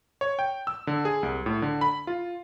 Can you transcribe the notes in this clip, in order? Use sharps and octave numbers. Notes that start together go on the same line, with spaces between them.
C#5
G5
E6
D3
G#4
C2
A2
D3
B5
F4